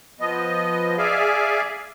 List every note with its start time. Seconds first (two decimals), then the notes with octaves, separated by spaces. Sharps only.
0.20 F3 B3 D#5
0.98 G#4 D5 E5 F5 G#5